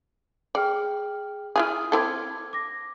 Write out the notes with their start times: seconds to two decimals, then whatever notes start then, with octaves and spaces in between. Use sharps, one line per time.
0.55 G#4 D5 G5 F6
1.56 E4 F4 G#4 D#6 F6
1.92 C4 E4 A4 D6 G#6
2.53 D6 A#6